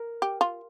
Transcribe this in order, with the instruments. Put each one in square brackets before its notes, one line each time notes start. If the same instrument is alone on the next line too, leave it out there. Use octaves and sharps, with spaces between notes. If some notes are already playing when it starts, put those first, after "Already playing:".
Already playing: [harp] A#4
[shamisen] G4
F4